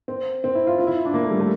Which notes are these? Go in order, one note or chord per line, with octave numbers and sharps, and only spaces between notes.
C4
C4
E4
F4
F4
E4
D4
A#3
A3
G3
A3